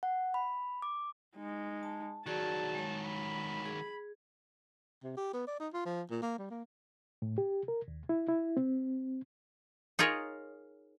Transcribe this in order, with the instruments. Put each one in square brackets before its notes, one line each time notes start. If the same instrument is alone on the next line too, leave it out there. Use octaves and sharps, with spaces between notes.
[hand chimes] F#5
B5
D6
[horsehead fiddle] G#3 D#4
[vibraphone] A5
[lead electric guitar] D#3 F#3 [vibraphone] F#4 G#4 D5 [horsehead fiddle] A5
[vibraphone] G#3 C#5
[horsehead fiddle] B5
[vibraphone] G#4
[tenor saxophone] C3
G4
B3
D5
D#4
F4
F3
A#2
A#3
G3
A#3
[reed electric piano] A2
G4
A#4
D#2
E4
E4
C4
[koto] D#4 F4 G#4 A#4 C#5